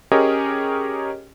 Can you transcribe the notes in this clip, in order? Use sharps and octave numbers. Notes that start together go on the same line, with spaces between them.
C#4 G4 G#4 A#4 C#5 D#5